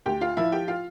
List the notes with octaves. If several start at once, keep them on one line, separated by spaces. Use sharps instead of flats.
D2 G4 G5
F4 F5
F3 E4 E5
G4 G5
F4 F5